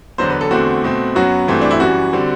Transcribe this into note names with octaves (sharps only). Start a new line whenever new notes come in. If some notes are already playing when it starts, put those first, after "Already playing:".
E2 D3 F#3 B3 C5
B4
A4
E2 D3 A3 C4 F#4
B2 A3 C4
F#2 F#3 B3 F#4
G2 E3 A3 C4
D4
E4
F#2 E3 G3 F#4
D3 G3 C4